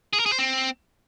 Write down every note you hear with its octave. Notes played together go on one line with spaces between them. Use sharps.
G#4
A#4
G#4
C5
C4